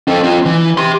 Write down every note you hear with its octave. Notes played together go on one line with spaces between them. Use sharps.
C4 A4
C4 F4
E3
G4 C6